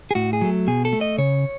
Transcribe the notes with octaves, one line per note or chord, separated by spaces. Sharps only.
G#4
A2 F#4
G#4
F#3 A3
B2 G#4
A4
A3
D#5
C#3 C#5